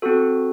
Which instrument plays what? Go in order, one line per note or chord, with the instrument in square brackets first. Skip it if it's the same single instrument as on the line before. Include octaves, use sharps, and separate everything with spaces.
[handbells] C4 F#4 A4